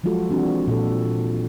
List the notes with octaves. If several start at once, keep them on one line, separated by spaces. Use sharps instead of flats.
F3 F#3 G#3 F4 F#4 A4
E3 C4 D4 F#4 G4
A#2 A4